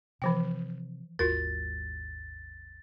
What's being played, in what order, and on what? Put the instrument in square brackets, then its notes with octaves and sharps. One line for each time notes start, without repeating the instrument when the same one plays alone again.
[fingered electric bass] C3 [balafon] E3 F3 G5
[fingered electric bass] G#1 D#2 G#3 [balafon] F4 F#4 A#4 [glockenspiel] A6